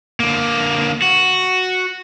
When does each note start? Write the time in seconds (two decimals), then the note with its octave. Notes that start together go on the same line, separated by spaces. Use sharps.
0.20 D3 A#3
1.02 F#4